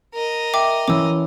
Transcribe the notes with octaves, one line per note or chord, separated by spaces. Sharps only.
A#4 D#5
E5 G5 D6
E3 C#4 D6 E6